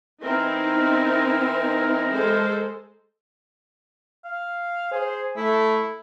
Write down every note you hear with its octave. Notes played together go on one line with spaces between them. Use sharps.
E3 C4 D#4 E4 A#4
G#3 A4 C5
F5
G#4 C5
A3 E4